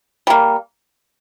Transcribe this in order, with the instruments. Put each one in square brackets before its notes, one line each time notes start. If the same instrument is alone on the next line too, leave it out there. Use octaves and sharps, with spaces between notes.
[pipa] G3 A#3